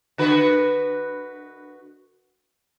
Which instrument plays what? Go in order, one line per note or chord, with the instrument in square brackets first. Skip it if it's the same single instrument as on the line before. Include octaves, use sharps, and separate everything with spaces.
[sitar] D3 F#4 B4